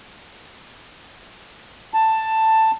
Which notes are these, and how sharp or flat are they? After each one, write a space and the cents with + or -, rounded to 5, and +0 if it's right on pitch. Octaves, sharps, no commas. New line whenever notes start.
A5 +10